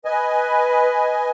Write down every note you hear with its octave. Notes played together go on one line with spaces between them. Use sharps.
B4 D#5 G#5